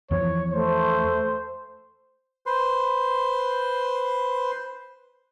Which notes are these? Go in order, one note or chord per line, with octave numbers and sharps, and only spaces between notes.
E2 E3 F3 C#5
A3 C5
B4 C5 C6